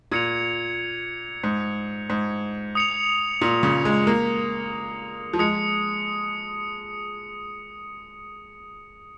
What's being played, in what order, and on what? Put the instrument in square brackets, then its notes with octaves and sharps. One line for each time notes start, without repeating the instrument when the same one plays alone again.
[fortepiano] A#2 [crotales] G#6 C#7 F7
[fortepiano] G#2
G#2
[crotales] D#6 C#7 F7
[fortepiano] A#2
C#3
G#3
A#3
F3
[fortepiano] G#3 [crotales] D#6 C#7